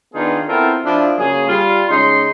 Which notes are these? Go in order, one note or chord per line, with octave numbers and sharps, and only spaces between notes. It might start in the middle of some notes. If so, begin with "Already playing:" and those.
D#3 B3 D4 D#4 F4 G#4
B3 C4 E4 F4 A4 A#4
F3 D4 E4
C#3 F#3 A#3 G#4
G3 F4
C#3 G#3 C#4 D#4 C6